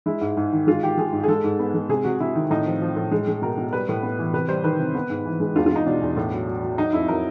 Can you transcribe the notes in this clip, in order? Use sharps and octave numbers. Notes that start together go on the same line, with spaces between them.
G#3 E4
G#2
G#2
D#3
G#3 F4
D#3 G4
G#3 G#4
G#2
G#4
G#3 A4
G#2
B3
G#3
C3 G#4
C3 F#4
C3 E4
D#3
A2 D#4
F3
F3
A2
G#3
G#3
B2 A#4
B2
G3 B4
A2
B3
E3
C3 B4
G3 C5
D#3 B4
C3
B3
G#2
E3
G#3
E2 F4
F4
E2 D#4
B2 D4
E2
A2
F#3
F#3
F#3
F#3 D#4
F2 E4
F#3 A#4